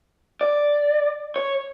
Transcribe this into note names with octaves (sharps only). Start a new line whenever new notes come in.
D5
C#5